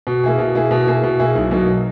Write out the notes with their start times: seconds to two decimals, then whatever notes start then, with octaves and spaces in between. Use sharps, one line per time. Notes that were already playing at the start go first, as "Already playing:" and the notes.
0.07 B2
0.24 A#3 E4 G#4
0.39 B2
0.55 A#3 E4 G#4
0.71 B2
0.87 A#3 E4 G#4
1.04 B2
1.19 A#3 E4 G#4
1.36 B1
1.51 B2 F#3 A#3 D#4